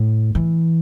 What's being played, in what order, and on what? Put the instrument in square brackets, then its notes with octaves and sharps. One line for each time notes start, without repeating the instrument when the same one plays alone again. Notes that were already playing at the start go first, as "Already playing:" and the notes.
Already playing: [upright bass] A2
E3